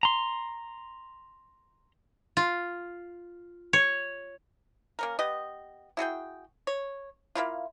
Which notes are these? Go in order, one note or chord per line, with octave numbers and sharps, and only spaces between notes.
A#5 C6
F4
C#5
A#3 C#4 A#4
B3 G4 D#5
E4 F#4 G#4 G5
C#5
A#3 D4 E4 F4